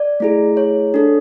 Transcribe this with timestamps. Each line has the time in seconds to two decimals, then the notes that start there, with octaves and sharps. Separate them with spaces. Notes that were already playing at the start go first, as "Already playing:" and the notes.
Already playing: D5
0.20 A3 E4 G#4
0.57 C#5
0.94 D4 A4